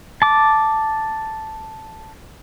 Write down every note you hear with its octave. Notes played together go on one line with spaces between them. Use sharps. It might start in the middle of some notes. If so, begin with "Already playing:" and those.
A5 D6